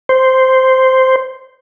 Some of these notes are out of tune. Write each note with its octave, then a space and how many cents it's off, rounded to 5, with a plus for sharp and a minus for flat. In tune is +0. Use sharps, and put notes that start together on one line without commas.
C5 -5